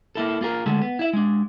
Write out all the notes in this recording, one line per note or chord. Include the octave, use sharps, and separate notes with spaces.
A#3 E4 A4
A#3 F4 G#4 A#4
D3 G#3 A3 A4
B3
E4 E5
G#3 D4